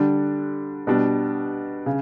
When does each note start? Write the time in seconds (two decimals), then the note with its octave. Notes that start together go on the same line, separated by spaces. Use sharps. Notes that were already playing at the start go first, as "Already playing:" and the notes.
Already playing: D3 G3 D4
0.87 B2 G3 D4
1.86 C#3